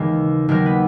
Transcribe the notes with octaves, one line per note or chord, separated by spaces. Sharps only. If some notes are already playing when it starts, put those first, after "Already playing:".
Already playing: D#2 C#3 E3 G#3
D#2 D#3 F#3 A#3 A#4
B3 B4